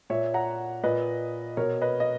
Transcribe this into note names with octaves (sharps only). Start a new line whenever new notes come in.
A#2 C#5 E5
F#5 A#5
A#2 B4 D#5
B2 A#4 C#5
B4 D#5
D#5